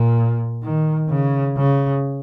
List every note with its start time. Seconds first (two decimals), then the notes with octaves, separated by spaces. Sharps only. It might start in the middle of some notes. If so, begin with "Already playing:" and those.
Already playing: A#2
0.63 D#3
1.10 C#3
1.57 C#3